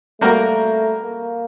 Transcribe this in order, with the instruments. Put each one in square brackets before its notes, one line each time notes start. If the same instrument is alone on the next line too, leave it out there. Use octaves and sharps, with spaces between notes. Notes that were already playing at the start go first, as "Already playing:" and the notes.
[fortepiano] G3 A#3 F#4 A#4 [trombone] A3
[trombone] A#3